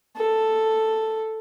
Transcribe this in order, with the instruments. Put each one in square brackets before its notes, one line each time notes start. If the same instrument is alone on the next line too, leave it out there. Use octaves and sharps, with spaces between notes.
[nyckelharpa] A4